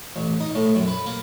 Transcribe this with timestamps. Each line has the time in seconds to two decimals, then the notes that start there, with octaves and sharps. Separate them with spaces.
0.16 A1
0.40 D#4
0.55 A2
0.75 F#2
0.88 B4
1.06 A#3